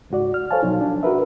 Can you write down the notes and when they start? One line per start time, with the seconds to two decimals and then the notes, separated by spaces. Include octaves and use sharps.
0.10 C#2 G#2 F#4 D5
0.34 F6
0.51 A4 C5 C#5 F5 G#5 A5
0.63 B2 F3 F#3 D#4
0.81 D4
1.03 F#4 A#4 B4 E5